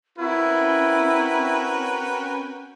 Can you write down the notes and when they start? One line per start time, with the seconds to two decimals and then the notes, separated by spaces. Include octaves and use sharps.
0.18 C4 C#4 E4 F#4 A#4 B4 G5 G#5